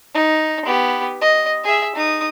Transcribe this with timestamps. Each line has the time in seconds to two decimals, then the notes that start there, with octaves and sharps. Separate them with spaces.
0.15 D#4
0.65 B3 G4
1.21 D#5
1.64 G#4 E5
1.96 D#4 D#6